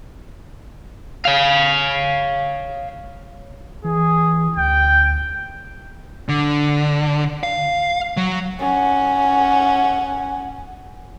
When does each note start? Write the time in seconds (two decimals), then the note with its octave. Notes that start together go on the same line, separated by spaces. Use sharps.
1.25 C#5 F5
3.84 E3 G#4
4.56 D2 G5
6.29 D3
7.43 F5
8.17 F#3
8.60 C#4 F#5